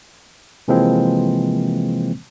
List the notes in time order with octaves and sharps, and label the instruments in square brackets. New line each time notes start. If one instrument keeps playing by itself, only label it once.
[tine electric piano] C3 E3 F3 G#3 A#3 C4